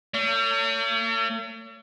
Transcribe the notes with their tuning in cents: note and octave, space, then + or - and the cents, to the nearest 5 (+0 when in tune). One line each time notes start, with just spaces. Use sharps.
A3 +45 C#5 +35